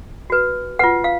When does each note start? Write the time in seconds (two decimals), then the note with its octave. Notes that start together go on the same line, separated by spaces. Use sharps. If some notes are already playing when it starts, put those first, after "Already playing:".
0.30 F#4 B4
0.79 F4 B4 F#5
1.04 F5